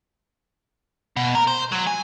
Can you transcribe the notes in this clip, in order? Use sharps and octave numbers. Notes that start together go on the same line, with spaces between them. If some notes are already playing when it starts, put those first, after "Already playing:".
B2
A#4
C5
F#3
G#5